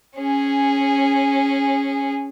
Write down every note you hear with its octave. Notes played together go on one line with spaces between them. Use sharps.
C#4 G#4